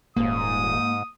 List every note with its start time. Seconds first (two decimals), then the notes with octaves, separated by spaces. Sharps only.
0.16 D#1 G#2 A#3 D#6